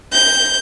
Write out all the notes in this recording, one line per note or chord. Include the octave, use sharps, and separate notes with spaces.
G6